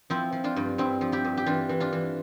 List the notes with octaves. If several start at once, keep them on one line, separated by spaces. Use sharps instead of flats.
F3 C4 E4
F3
D4 F4
G2
G2 C4 E4
F3
E4 G4
G2
G4
E3 D4 F4
E3
D4 F4
E3